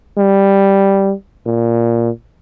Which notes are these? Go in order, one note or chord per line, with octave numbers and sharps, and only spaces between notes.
G3
A#2